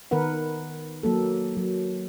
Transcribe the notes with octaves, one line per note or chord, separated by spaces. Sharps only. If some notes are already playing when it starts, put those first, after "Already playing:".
D#3 B3 A#4 B4 F#5
F#3 A#3 A4
F#3